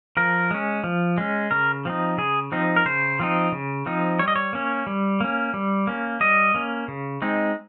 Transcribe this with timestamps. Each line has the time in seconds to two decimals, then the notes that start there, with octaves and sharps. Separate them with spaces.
0.17 F3 A#4
0.51 G#3 C#4
0.84 F3
1.18 G#3 C#4
1.51 C#3 A#4
1.85 F3 C4 D#4
2.18 C#3 G#4
2.52 F3 C4 D#4
2.76 A#4
2.85 C#3 C5
3.20 F3 C4 D#4
3.52 C#3
3.86 F3 C4 D#4
4.19 G3 C#5
4.28 D#5
4.36 C#5
4.53 A#3 C#4
4.87 G3
5.20 A#3 C#4
5.54 G3
5.87 A#3 C#4
6.20 G3 D#5
6.54 A#3 C#4
6.88 C#3
7.22 G#3 C4 D#4